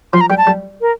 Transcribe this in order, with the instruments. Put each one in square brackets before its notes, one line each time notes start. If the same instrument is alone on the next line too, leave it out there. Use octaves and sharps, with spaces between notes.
[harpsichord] F3 [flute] C6
[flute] A#5
[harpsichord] G3 [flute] G5
[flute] A5
[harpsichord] G3
[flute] A#4